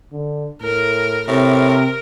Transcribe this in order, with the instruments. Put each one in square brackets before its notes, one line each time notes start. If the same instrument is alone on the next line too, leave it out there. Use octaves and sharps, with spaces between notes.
[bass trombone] D3
[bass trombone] A2 [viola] A#4
[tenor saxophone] A2 [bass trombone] C3 [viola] A#4